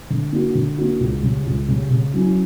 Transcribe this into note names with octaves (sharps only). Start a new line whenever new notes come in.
D3
A#3 D4 F#4
D3
A#3 D4 F#4
C#2
C#3 G3
C#2
C#3 G3
C#3
F#3 C#4 E4